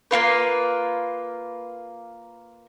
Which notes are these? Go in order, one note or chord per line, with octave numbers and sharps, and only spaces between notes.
A#3 C4 F4 B4